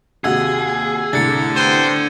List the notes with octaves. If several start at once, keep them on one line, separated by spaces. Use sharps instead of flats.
D#2 C3 F#4 G#4 E6 G#6
C2 A2 D4 A4 A6 C#7
B3 C5 G5 G#6 D#7